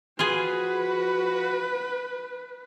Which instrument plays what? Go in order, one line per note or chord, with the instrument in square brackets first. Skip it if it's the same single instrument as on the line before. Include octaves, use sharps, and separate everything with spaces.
[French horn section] F3 F#4 [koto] F4 G#4 [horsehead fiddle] B4